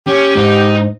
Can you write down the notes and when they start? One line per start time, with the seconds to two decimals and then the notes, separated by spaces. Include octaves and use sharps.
0.07 C#4 G4
0.37 G#2 D#4